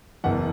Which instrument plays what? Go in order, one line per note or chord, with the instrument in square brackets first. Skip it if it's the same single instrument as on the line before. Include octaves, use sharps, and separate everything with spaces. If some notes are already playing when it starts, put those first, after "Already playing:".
[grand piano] F#1 E2 E3 F#5